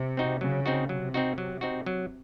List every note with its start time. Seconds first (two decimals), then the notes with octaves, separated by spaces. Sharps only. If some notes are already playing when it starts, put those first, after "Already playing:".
Already playing: C3
0.17 C4 D#4 F#4
0.41 C#3 F#3
0.66 C4 D#4 F#4
0.89 C3 F#3
1.14 C4 D#4 F#4
1.38 F#3
1.61 C4 D#4 F#4
1.86 F#3